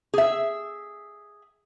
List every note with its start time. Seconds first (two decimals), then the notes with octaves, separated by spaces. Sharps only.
0.14 G#4 E5